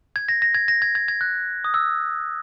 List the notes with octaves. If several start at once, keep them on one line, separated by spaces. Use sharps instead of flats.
G#6
A#6
A#6
G#6
A#6
G#6
G#6
G#6
F#6
D#6
E6